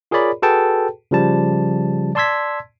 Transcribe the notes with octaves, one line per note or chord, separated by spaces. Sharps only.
F4 G#4 A#4 C#5 D5 B5
F#4 G#4 A4 B4 G5 A5
C#3 F3 G3 A5
D5 A5 C6 E6 G#6 B6